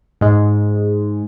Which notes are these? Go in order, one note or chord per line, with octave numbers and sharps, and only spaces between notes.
G#2 G#3